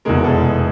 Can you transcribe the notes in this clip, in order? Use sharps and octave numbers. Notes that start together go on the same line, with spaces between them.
F1 E2 B2 G#3 A#4
A4